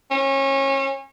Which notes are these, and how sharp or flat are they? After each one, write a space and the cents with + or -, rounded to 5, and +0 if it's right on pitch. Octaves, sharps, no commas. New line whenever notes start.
C#4 -30